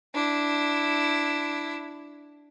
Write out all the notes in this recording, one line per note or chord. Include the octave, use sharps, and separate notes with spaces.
D4 E4